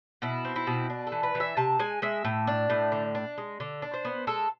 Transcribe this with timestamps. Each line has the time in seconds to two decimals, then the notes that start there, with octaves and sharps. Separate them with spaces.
0.22 B2 E4
0.45 C4
0.56 E4
0.67 B2
0.90 D4
1.07 A4
1.12 E3
1.23 B4
1.35 E3
1.40 E5
1.57 C3 A5
1.79 G#3 G#5
2.02 G#3 E5
2.24 A2
2.47 D4
2.70 A2
2.92 D3
3.15 D4
3.38 G#3
3.60 D3
3.82 D4
3.94 C5
4.05 B3
4.27 G#3 A4